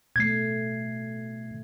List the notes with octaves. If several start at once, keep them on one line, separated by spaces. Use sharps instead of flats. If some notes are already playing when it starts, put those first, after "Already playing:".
B2 A3 G#6 C7